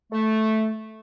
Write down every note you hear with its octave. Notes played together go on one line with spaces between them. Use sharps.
A3